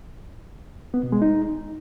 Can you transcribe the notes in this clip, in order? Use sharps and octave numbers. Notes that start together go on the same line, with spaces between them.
B3
B2
G#3
D#4